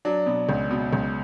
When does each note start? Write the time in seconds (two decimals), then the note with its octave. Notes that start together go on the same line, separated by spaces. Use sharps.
0.05 F#3 D4
0.26 B2
0.49 C#2
0.71 B2
0.93 C#2